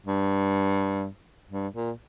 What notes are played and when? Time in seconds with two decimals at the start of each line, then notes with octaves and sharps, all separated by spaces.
0.06 G2
1.51 G2
1.74 A#2